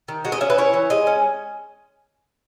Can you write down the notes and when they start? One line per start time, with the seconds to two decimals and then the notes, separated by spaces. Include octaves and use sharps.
0.08 D#3
0.25 G#3 F#4
0.32 D#5
0.41 C#4 E5
0.50 B4
0.58 E4 C#5
0.74 E3
0.90 G#3 D#5
1.07 C#4